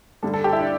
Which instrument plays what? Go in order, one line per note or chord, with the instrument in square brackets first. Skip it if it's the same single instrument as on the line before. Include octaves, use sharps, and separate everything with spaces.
[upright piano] G2 D3 G3 A4
A4
G4
E4
D4